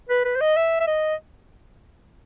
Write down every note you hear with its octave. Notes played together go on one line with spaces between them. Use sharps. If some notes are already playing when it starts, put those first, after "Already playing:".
B4
B4
C5
D#5
E5
E5
D#5